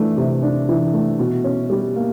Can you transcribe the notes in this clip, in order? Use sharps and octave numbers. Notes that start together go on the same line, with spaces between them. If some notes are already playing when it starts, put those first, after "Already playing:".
Already playing: E3 A3 D4
C3
D4
E3
A3
B2
C#4
G3
A#3